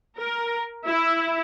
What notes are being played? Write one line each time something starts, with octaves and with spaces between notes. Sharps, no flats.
A#4
E4